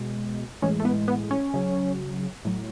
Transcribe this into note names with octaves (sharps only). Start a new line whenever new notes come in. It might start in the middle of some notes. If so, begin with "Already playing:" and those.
Already playing: B2 G#3
A2 E3 G#3 C#4
A3
B3
B3
C#4
C#3 F#3
A2 F#3